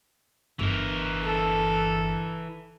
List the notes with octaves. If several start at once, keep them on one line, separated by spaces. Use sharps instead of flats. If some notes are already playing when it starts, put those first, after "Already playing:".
G1 E3 A#4
A4